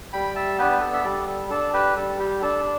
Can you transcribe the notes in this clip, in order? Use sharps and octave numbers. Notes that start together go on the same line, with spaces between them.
G3 G5 B5
E5 A5
B3 D4 G4 B4
B4
A4
E5
G3 A4 D5
A4
D4 A4
G4 B4
G3 A4
G4
D4 A4